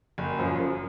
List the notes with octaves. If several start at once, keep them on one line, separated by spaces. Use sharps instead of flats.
F#1
F#2 F3
F#2